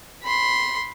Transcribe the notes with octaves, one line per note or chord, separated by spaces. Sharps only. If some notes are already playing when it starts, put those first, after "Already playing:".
B5 C6